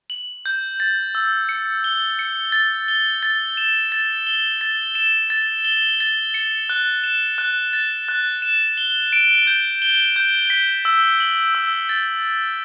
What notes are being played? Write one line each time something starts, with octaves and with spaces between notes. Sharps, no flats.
F#7
G6
A6
E6
C#7
G7
C#7
A6
G7
A6
E7
A6
G7
A6
E7
A6
G7
A6
C#7
F#6
E7
F#6
A6
F#6
E7
G7
D7
G6
G7
G6
B6
E6
F#7
E6
A6